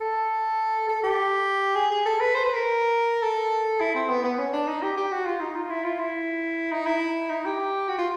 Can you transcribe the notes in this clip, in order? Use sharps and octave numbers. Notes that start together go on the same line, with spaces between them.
A4
A4
G4
G#4
G#4
A4
B4
C5
B4
A#4
A4
E4
C4
B3
B3
C#4
D4
D#4
G4
G4
F#4
F4
D#4
F4
E4
F4
E4
D#4
E4
D#4
G4
F#4
F4